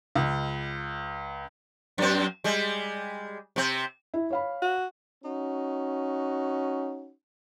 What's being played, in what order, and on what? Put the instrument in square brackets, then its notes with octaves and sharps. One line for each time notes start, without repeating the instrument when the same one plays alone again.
[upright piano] C#2
[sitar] F#2 C4
G3 G#3
C3 C4
[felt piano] E4
C#5 F5 B5
[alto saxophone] F#4
[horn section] C#4 D#4 F#4